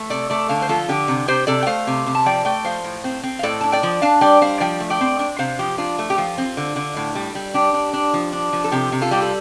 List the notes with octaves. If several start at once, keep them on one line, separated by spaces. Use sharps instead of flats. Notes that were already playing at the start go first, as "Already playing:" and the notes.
Already playing: A3
C3 A4 D5
A3 A4 D5
D3 F5 A5
C5
F3 F4 A4
D3 G4
C3
C3 G4 C5
C3 A4 D5
G5
A3 C5 F5
C3
C3
A5
F3 D5 G5
A3 D5 G5
F3 C5 F5
A2
C4
C4
F5
A2 A4 D5
D4 A5
D5 G5
F3
D4 F5 A5
G3 D5 G5
G3 C5 F5
F3 D5 G5
A3
D5 G5
C4
D4
C3 C5 F5
F3 G4
D4 F4
A3
G4
F3 F4
C4
D3
D3
A2
G3
G3
D4 G4
D4
D4
F3
D4
F3
A4
C3 G4
C3
F4 A4
G3 G4
A4